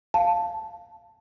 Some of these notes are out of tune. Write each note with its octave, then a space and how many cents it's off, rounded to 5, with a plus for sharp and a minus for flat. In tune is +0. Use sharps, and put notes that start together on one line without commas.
F5 +0 A5 +0